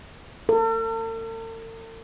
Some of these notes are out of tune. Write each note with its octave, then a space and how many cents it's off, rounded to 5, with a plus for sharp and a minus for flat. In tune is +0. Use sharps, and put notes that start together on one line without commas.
A4 +45